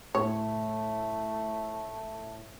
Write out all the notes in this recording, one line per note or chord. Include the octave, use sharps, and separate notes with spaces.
A2 A3 C#5